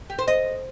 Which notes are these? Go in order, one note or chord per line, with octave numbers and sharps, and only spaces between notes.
G4
C5
D#5